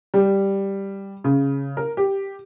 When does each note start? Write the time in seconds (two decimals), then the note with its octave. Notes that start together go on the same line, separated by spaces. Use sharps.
0.14 G3
1.24 C#3
1.77 A#4
1.97 G4